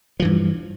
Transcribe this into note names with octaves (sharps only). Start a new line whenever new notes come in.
G2 E3 F3